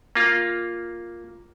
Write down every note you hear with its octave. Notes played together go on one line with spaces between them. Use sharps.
A#3 F4